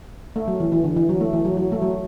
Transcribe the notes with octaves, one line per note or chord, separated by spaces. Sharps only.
A3
F#3
E3
E3
D3
E3
F#3
A3
E3
F#3
F#3
A3
F#3